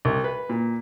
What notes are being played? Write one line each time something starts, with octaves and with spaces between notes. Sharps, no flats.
C2
B4
A#2